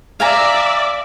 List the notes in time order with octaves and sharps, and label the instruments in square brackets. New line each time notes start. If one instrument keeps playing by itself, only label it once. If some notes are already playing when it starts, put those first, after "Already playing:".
[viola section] D5 E5 [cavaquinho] F5 G#5 A#5